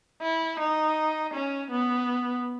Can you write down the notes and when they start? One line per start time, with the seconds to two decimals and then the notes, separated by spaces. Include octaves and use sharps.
0.22 E4
0.59 D#4
1.34 C#4
1.71 B3